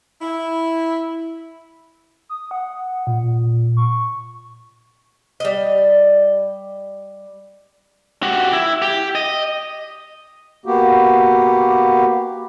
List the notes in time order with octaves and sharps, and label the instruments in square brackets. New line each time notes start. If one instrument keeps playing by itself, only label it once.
[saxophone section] E4
[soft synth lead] D#6
F#5
A#2
C#6
[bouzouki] G3 D#5
[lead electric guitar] F#4 G4
E4
G4
D#5
[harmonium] A#3 B3 F#4 G4